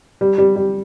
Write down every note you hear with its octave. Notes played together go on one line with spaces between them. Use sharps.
G3
G3
G3